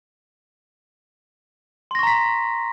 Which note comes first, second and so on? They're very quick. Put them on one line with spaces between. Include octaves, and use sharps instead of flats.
C6 A#6 C#6 A#5 B6